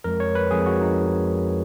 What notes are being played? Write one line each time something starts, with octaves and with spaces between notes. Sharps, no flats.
F2 F3 G#3 A#4
C#5
B4
F2 F3 G#3 G#4
F#4
D#4